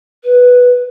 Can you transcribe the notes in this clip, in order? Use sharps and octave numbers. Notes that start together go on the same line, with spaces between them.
B4